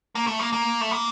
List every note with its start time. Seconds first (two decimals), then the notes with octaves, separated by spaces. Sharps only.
0.15 A#3
0.27 A3
0.39 A#3
0.53 A#3
0.81 A3
0.91 A#3